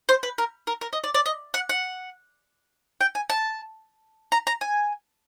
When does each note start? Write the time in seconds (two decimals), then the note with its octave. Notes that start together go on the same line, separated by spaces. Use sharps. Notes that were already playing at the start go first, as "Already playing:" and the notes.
0.09 C5
0.23 B4
0.38 A#4
0.67 A#4
0.81 A#4
0.93 D#5
1.04 D5
1.14 D5
1.26 D#5
1.54 F#5
1.69 F#5
3.01 G5
3.15 G#5
3.30 A5
4.32 A#5
4.47 A#5
4.61 G#5